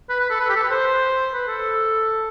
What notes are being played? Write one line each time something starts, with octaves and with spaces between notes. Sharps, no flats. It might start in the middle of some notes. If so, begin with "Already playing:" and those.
B4
B4
A4
B4
G4
A4
B4
C5
B4
A4